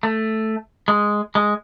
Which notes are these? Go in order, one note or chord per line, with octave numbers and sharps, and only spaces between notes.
A3
G#3
G#3